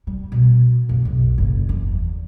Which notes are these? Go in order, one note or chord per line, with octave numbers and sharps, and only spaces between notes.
G3
B2
F#1
B1
F#1
E2